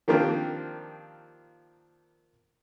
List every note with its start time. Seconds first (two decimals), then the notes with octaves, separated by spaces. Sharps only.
0.08 D#3 F3 A#3 C4 D4 G4